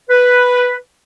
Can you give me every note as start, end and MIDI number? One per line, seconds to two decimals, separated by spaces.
0.10 0.75 71